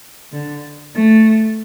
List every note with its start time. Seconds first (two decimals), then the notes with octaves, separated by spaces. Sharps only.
0.32 D3
0.94 A3